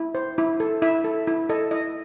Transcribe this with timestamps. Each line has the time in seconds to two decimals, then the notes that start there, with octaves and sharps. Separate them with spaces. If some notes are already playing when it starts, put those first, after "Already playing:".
Already playing: E4
0.15 C5
0.38 E4
0.60 A4
0.82 E4 E5
1.04 A4
1.27 E4
1.49 A4 D#5
1.71 E4 D#5